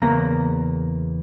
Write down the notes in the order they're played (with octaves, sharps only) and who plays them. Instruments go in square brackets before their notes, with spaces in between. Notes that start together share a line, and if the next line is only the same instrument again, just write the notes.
[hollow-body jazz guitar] E2 C#3 A#3 A#5